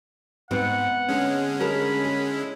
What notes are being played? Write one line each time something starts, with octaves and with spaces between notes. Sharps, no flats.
G#2 B3 C4 F#5
D3 G#3 C#4
G#4 A#4 A5 B5
G#4
E4